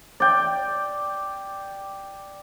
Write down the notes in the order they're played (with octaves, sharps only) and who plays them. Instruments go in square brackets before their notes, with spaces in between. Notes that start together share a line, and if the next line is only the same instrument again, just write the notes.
[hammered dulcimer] D5 G5